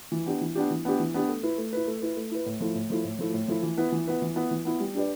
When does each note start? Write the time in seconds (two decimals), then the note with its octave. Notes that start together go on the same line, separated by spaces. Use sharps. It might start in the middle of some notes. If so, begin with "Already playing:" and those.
0.12 E3
0.26 B3 D4 G4
0.41 E3
0.55 B3 D4 G4
0.70 E3
0.85 B3 D4 G4
1.00 E3
1.14 B3 D4 G4
1.29 A3
1.43 E4 B4
1.58 A3
1.73 E4 B4
1.87 A3
2.02 E4 B4
2.17 A3
2.31 E4 B4
2.46 A2
2.60 F3 A3 E4
2.75 A2
2.90 F3 A3 E4
3.04 A2
3.19 F3 A3 E4
3.34 A2
3.48 F3 A3 E4
3.63 E3
3.77 B3 E4 B4
3.92 E3
4.07 B3 E4 B4
4.22 E3
4.36 B3 E4 B4
4.51 E3
4.65 B3 E4 B4
4.80 G3
4.95 D4 G4 B4 D5